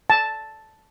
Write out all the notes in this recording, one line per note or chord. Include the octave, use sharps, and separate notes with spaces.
A5